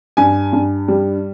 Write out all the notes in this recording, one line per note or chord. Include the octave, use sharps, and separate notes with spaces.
G2 G#5
G2
G3